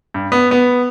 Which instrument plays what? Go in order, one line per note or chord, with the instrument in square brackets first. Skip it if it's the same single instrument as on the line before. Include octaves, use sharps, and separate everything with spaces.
[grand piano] G2
B3
B3